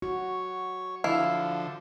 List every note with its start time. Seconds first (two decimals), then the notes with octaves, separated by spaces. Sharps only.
0.02 F#4 C#5
1.04 D3 F3 E4 F5